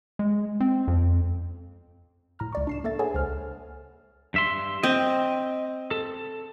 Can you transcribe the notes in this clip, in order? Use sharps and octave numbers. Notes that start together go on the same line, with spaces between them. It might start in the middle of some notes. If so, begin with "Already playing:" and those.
G#3
C4
F2
A2 A#5 F6
C#2 D5 C#6
D4 C7 E7
A#3 A4 E5 A6
G#4 A4 B4 C#5 F#5 G#5
C#2 C5 F6
G2 E5 C6
C4 D#5 G5
A4